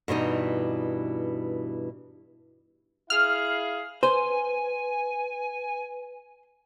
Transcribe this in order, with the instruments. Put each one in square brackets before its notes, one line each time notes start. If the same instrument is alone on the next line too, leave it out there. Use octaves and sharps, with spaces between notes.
[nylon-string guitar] G2 B2 E3 D#4
[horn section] E4 G#4 F5 [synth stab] F6
[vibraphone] B4 [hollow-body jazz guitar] C5 [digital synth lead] G#5